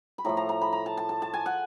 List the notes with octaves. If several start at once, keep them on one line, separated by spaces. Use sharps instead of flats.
B5
A2 F3 A3 A#5
A#5
A#5
B5
A#5
A5
A5
A5
A5
G#5
F#5